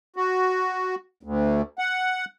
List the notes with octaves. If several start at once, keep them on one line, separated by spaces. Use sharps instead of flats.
F#4
D2
F#5